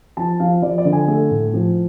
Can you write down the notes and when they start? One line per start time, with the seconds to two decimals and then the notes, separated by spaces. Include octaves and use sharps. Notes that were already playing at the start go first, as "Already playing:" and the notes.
0.17 F3 A5
0.40 F3 F5
0.62 F3 D5
0.78 D5
0.85 D3
0.93 G#5
1.08 A3
1.31 A2
1.54 F3